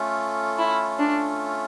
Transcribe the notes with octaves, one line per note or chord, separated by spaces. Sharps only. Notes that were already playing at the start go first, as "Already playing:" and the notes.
Already playing: A3 C#4 F4 A4
E4
D4